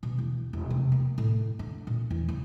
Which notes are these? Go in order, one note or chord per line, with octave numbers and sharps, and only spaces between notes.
B2
E2
E1
C3
A#3
A2
D3
A#2
E2
C#3